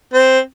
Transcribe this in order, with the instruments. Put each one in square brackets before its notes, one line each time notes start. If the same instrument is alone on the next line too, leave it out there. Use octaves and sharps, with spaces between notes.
[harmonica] C4